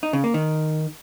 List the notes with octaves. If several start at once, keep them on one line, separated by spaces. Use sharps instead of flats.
D#4
C#3
A#3
D#3